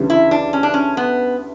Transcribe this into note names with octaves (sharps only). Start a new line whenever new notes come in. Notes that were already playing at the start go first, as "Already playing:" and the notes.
Already playing: D2 C#3 E3 G3
E4
D4
C#4
D4
C#4
B3